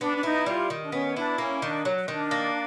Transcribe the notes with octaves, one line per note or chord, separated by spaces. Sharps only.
B3 D4
D4
D#4 E4
G3 F4
D#3
D4
B3 C#4
D4 E4
A#3 C#4
D#3 D4
F#3
D#3 D4
A#3